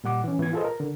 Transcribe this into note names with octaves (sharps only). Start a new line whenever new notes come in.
A#2 G3 F#5 D6
E3 C#4
G#2 E3 B3 E4 B4 G#6
F4 G#4 A4 B4 C5 D#5
A#4
D3